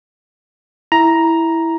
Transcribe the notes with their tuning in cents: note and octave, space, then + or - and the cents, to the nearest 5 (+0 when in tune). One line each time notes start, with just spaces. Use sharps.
E4 +0 A#5 +10